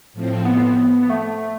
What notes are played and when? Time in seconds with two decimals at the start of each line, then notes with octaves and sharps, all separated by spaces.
0.13 A2 F3 C4
0.45 B3
1.03 B3
1.10 A3